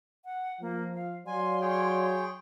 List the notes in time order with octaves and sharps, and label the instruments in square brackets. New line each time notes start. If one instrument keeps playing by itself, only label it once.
[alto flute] F#5
[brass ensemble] F3 [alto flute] A#3
[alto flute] F5
[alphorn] F#3 [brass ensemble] D5 F5 [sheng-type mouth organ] G#5 [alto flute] C6
[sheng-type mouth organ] G#4 C#5 G5